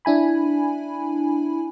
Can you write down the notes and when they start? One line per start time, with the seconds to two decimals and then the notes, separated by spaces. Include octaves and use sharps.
0.05 D4 E4 G#5 B5